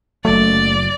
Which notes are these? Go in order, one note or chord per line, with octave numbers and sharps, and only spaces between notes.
F#1 F#3 A3 D5